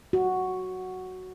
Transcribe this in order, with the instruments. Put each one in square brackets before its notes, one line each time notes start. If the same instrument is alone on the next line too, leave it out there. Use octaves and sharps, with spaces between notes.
[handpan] F#4